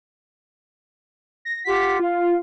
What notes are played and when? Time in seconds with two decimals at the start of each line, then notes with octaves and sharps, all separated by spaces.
1.45 A#6
1.65 F4 G4 F#5 B6
1.99 F4 F5